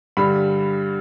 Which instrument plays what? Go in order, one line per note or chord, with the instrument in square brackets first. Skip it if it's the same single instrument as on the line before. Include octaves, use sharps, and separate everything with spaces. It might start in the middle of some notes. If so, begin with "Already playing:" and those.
[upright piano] G2 D3 G3 B5